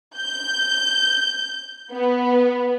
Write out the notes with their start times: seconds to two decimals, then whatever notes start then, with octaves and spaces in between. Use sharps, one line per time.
0.17 G6
1.93 B3